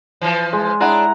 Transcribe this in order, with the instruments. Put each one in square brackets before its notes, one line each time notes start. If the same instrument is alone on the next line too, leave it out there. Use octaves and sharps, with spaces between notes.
[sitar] E3 F3
[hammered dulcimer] G#3
[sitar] D4 G#4 [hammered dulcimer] E4 F#5 A#5